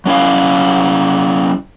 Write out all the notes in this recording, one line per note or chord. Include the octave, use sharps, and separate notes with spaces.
F#3 C#4 E4 F5